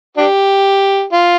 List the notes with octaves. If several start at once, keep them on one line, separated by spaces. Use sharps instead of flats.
D4 G4
F4